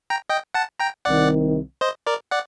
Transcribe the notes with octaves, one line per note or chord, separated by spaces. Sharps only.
G5 A#5
D#5 G5
F#5 A5
G5 A#5
C2 C3 D#3 D5 F#5
C5 D#5
A#4 D5
D5 F#5